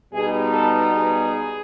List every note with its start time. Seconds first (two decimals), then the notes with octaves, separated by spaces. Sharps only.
0.13 B2 G3 B3 D#4 G#4
0.53 A4
0.94 G#4